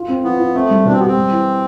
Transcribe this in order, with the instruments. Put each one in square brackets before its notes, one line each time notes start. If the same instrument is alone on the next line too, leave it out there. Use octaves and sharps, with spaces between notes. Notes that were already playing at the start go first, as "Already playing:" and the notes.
Already playing: [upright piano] F4
C4
[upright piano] F3 [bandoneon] B3
[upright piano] F3
[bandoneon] A3 [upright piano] C4
[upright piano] G3
[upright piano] B2 [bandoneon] D4
[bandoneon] C4
[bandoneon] B3 [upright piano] G4
[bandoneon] C4
[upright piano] G3
E3